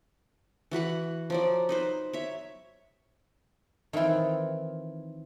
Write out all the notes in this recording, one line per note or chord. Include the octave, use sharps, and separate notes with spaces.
E3 F#4 B4 F#5
F3 F#3 D5
D#4 B4 C5
C#5 E5
D#3 E3 C4 E4 F4